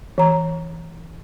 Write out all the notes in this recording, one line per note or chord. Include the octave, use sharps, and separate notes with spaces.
E3 A#5